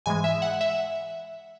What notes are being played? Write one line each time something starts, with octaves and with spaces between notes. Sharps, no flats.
G#2 E3 G#3 G#5
E5
F#5
E5